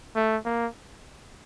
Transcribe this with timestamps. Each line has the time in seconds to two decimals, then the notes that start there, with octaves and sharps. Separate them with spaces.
0.15 A3
0.45 A#3